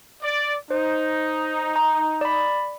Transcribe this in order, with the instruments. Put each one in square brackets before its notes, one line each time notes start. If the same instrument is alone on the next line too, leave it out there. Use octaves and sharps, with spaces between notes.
[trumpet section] D5
[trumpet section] D#4 [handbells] C5
[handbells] A#5
D5 B5